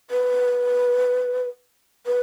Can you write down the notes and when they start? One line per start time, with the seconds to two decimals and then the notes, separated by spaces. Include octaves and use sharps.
0.11 B4
2.06 B4